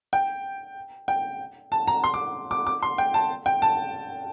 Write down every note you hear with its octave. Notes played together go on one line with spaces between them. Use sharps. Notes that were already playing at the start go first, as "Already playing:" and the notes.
G5
G5
A5
A#5
C6
D6
D6
D6
C6
G5
A5
G5
A5